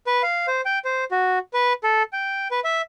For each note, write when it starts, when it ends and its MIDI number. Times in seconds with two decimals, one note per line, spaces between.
0.07 0.22 71
0.23 0.46 77
0.47 0.61 72
0.65 0.79 79
0.85 1.04 72
1.11 1.39 66
1.53 1.73 71
1.84 2.03 69
2.13 2.48 79
2.51 2.60 71
2.64 2.82 76